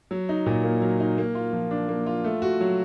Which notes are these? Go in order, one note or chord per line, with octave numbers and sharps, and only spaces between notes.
F#3
D#4
A#2
A#3
F#3
D#4
A#3
F4
F3
D4
A#3
F4
A3
F#4
F#3